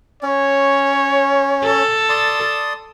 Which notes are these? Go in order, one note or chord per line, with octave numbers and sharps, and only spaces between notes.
C#4 C#5
A4
D5 C6 D#6